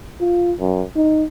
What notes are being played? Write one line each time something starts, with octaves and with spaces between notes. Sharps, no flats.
F4
F#2
D#4